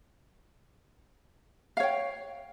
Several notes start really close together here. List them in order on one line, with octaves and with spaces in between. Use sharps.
F5 C#5 G5